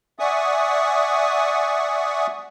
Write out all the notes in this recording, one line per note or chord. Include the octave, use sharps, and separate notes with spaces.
D5 E5 F#5 G#5 C#6 D#6